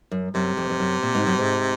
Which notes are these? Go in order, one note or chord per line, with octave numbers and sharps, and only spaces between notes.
F#2
F#2 C3
F2
F2
F#2
A#2
G#2
F#2
G#2